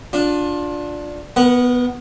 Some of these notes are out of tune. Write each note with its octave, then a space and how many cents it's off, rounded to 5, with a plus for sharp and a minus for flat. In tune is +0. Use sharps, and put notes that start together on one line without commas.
D4 +0 F4 +25
B3 +0 A#4 +40 F#5 +0